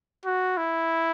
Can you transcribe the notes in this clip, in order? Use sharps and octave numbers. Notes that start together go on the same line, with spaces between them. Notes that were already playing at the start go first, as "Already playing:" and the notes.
F#4
E4